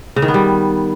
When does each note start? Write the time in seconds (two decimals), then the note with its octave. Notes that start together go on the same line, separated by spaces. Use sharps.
0.16 C#3
0.22 D#3
0.28 B3
0.34 G3